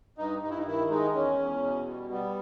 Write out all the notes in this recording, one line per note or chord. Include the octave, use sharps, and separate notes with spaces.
G2 D#4
G2 D#4
E4
D#4
D#3 E4
G#3 D#4
E2 C#4
E2
B2
G3
G3 B3